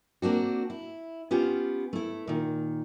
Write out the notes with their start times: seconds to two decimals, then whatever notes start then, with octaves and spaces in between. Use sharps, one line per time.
0.22 A#3 C4 D4 F#4
0.70 E4
1.31 B3 C#4 F4 G4
1.93 A3 E4
2.27 A#2 D#3